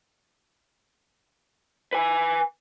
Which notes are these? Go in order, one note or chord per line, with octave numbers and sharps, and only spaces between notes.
B4 G#5